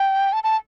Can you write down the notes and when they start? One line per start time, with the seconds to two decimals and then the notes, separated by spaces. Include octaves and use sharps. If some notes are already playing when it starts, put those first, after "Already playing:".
Already playing: G5
0.33 A5
0.44 A5